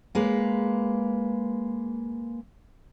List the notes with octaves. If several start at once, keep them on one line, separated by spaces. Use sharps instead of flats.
G#3 A#3 B4